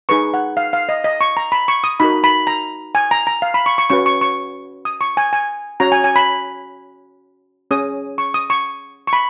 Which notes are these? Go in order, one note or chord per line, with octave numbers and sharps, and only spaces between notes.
D#4 G#4 B4 C#6
F#5
F5
F5
D#5
D#5
C#6
A#5
B5
C#6
D#6
D#4 F#4 A#4 B5
B5
A#5
G#5
A#5
A#5
F5
B5
C#6
C#6
C#4 F#4 B4 C#6
C#6
C#6
D#6
C#6
G#5
G#5
C#4 F#4 C#5 A#5
G#5
G#5
B5
C#4 G#4 C#5 D#6
C#6
D#6
C#6
C#6
B5